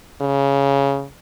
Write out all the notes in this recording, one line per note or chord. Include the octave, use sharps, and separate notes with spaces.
C#3